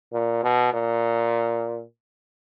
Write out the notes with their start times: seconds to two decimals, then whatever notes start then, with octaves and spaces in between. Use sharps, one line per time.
0.13 A#2
0.43 B2
0.73 A#2